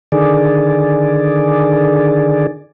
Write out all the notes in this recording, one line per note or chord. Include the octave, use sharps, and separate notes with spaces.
D3 D#3 G#4 D5